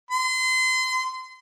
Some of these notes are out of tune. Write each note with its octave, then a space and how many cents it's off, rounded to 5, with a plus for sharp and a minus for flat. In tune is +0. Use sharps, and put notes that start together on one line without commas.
C6 -30